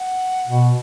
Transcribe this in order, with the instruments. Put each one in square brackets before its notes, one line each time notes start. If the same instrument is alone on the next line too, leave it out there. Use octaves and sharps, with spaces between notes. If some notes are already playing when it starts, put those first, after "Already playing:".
Already playing: [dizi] F#5
[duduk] B2